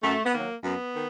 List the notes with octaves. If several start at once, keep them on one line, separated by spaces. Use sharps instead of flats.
F#2 A3
B3
D#3 F#3 A#3
F#2 B3
D#3